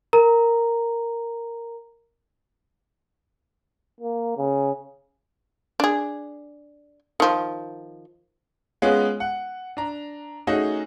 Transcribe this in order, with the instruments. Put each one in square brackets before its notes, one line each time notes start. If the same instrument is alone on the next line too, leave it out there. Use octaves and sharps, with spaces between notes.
[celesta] A#4 A#5
[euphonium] A#3
C#3
[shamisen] D4 G#4
D#3 F3
[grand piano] G#3 B3 C#4 F4 G#4
F#5
D4 A#5
A3 C#4 D#4 F#4 G#4